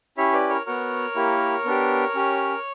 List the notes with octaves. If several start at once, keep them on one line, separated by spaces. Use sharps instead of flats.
C#4 E4 G4 C#5 E5
B4 D5
A#4 C#5
B3 F#4 A#4 C#5
A#3 E4 G4
B3 D4 G4
C#4 G4